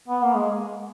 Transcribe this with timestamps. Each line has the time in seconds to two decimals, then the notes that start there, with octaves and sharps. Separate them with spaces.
0.08 B3
0.23 A#3
0.36 G#3